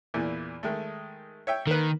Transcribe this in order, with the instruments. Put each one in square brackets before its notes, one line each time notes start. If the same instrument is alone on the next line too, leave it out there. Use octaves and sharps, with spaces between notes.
[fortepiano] E2 A#2 E3
D#3 G#3 A3
C#5 E5 G5
[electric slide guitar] D#3 [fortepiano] A#3 B4